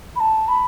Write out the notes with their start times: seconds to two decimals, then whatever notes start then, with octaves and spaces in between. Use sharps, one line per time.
0.16 B5
0.20 A5
0.48 B5